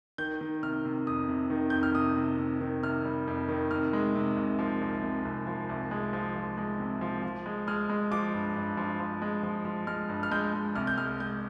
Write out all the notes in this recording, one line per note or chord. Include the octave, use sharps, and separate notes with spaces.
D#3 G6
D#3
C3 F6
C3
F2 D#6
C3
D#3
F2 G6
F6
C3 D#6
C3
C3
D#3
C3 F6
G3
F2
D#3
C3 F6
G#3
C3
C2
F3
C2
C3
C2
F3
C2
G#3
F3
F3
G#3
C3
F3
F3
G#3
G#3 F6
G#3
F3 D6
G2
G2
F3
F3
G#3
F3
F3
G#3 F6
G2
F6
G#3 G6
G#3
C2 F6
G6
G#3 F6
G#3 G6